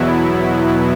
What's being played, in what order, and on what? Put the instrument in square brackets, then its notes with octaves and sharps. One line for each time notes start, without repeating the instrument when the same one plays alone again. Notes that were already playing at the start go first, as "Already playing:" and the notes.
Already playing: [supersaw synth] E2 B2 F#3 B3 E4